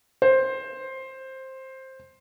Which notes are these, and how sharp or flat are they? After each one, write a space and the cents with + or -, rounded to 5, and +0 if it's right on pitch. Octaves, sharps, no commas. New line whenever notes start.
C5 +10